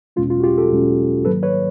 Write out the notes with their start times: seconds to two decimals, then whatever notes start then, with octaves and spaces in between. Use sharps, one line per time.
0.16 E2 B2 G#3 C#4 F4
0.30 F4
0.40 F#4
0.43 F4 G4
0.58 G4 A4
0.71 E2 B2 G#3 C#4
1.25 G#2 D#3 F#3 A#3 A4 B4
1.43 B4 C#5